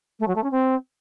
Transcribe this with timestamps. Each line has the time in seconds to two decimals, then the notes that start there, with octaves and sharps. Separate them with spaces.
0.20 A3
0.28 F#3
0.36 A3
0.43 C#4
0.51 C4